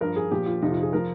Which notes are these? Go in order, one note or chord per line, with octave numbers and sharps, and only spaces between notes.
G2 F3 A#4
G#4
A#2 F3 G4
F4
F2 C3 F3 D#4
F4
G#4
F3 A#4